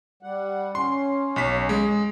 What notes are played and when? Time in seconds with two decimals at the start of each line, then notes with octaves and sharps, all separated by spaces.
0.23 G3 F#5
0.75 C#4 C6
1.36 B1 B6
1.69 G#3